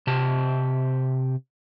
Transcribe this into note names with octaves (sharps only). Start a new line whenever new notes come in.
C3 G4 A5